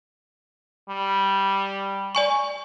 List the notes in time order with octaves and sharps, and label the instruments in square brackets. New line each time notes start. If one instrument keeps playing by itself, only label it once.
[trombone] G3
[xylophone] D5 G#5 C#6